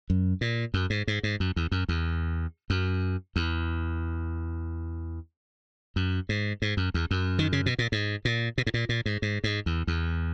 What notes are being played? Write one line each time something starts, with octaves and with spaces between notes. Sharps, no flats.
F#2
A#2
F#2
G#2
G#2
G#2
F#2
E2
F#2
E2
F#2
E2
F#2
G#2
G#2
F#2
E2
F#2
D#3
C#3
B2
A#2
G#2
A#2
B2
G#2
A#2
A#2
G#2
G#2
G#2
E2
E2